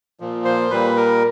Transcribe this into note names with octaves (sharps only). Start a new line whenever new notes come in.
A#2 F3
C5
A#2 G3 B4
A#4